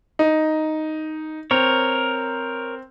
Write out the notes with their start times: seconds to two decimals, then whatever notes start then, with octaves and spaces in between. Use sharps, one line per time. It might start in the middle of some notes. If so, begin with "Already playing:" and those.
0.19 D#4
1.51 C4 A#4 C#5